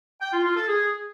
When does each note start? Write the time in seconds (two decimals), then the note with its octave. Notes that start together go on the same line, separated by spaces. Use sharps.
0.21 G5
0.33 F4
0.45 F4
0.56 A4
0.68 G#4